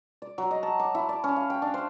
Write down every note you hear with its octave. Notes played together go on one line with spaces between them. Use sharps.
D5
F#3
D#5
A5
D6
E4
D5
C#4
F5
G5
D4
C5